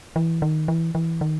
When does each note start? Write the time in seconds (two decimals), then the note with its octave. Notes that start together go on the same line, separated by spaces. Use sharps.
0.16 E3
0.42 D#3
0.68 E3
0.95 E3
1.21 D#3